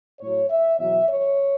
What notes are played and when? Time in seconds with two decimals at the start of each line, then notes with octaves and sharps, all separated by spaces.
0.21 A2 F#3 C#5
0.49 E5
0.79 E2 B2 F#3 E5
1.08 C#5